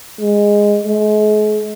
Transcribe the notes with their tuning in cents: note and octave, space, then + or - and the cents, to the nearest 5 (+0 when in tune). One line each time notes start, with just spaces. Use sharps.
G#3 -10
G#3 +40